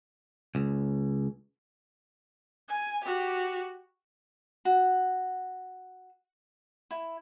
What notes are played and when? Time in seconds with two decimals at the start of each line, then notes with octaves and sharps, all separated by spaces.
0.55 C#2
2.68 G#5
3.04 F#4 G4
4.65 F#4
6.91 E4